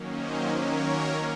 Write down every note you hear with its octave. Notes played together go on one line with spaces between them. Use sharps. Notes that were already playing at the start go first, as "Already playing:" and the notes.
Already playing: D#3 F#3 A#3 C#4
C5 D#5
A#4 C#5